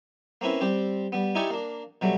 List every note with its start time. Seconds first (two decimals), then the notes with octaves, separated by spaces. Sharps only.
0.41 A#3 C4 C#4 E4 B4
0.61 G3 C4 G4
1.12 G3 B3
1.35 D#4 E4 G4 D5 G#5 C#6
1.50 A#3 D4
2.01 B2 F#3 G3 A3